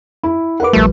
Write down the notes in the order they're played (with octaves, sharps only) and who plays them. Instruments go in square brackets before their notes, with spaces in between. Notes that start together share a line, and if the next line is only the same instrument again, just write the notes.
[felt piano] E4
[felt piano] A#4 B4 [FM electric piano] F#5 D6
[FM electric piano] A#1 F3 G3 [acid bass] A3